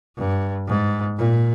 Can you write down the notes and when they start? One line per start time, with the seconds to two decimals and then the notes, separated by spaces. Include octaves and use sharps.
0.17 G2
0.67 G#2
1.18 A#2